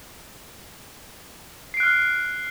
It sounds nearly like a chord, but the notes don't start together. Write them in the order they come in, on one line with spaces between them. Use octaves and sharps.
C7 D7 F#6 F6